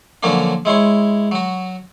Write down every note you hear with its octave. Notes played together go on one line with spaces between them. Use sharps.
D3 F3 F#3 A#3 C#4 D4
G#3 E4 C#5 C6
F#3 F#4